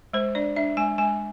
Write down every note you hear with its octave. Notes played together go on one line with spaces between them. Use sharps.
G#3 C5
D4 D5
D4 E5
G#3 G#5
G#3 G#5